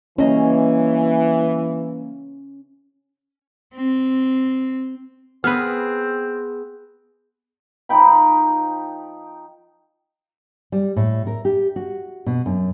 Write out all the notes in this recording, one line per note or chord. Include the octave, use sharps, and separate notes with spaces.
E3 G3 A#3 C#4 D#5
C4
B3 C4 G#4 B4 F6
F3 D#4 G5 B5
G3
A2
A#4
G4
F#4
B2
F#2